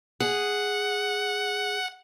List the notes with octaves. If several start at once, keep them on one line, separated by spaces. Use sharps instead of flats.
G#4 F#5